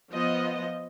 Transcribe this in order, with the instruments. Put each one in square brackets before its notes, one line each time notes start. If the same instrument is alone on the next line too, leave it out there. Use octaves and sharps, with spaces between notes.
[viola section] F3 B3 D#5